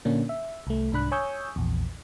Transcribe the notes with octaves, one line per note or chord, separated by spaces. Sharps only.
A#2 D3 A#3 C#4 D4
E5
C2 A3
C2 G#2 D4 B5 F#6
C#5 G#5 C#6 D#6 E6 G6
A#1 E2